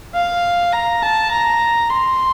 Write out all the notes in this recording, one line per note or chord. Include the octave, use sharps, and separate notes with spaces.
F5
A#5
A5
A#5
C6